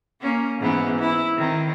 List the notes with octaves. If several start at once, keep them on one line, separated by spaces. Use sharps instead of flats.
A#3 C#4
G#2 E3 B3
E4
D#3 C4